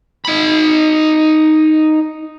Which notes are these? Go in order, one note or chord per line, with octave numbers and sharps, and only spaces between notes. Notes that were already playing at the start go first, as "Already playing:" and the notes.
D#4 B5